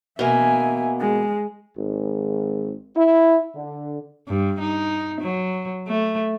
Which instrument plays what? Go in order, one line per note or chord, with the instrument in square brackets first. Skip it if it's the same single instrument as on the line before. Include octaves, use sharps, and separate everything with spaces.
[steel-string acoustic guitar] B2 A#3 [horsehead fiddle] E5 G#5
[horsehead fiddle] G#3
[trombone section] G#1
E4
D3
[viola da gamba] G2
D#4
F#3
A3